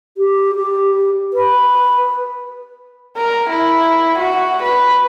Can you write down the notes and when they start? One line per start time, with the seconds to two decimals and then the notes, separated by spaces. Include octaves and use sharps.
0.17 G4
0.55 G4
1.33 B4
3.18 A#4
3.50 E4
4.19 F#4
4.63 B4